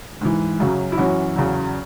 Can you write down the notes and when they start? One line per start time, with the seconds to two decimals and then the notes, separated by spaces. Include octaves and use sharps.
0.21 G#2 E3
0.60 F#2 C#3 F#3
0.92 E4
0.97 F#2 E3 C#4 F#4
1.36 E2 C#3 F#3